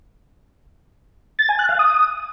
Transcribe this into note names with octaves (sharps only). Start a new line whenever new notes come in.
A6
G#5
F#6
F5
D#6